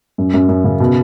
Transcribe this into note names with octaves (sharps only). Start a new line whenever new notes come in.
F#2
F#2
F#2
C#3
B2